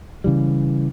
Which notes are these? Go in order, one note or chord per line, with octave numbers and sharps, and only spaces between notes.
C#3 E3 G3